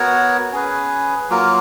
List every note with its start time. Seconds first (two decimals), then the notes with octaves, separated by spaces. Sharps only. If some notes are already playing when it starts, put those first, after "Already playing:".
Already playing: B3 F#4 A#4 C#5
0.52 C#4 G#4 B4
1.30 F#3 A#3 F4 A#4